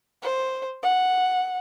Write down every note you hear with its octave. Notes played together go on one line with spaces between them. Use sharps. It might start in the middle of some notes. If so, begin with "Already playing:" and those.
C5
F#5